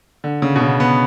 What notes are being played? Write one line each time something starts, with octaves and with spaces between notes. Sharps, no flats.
D3
C#3
B2
C#3
B3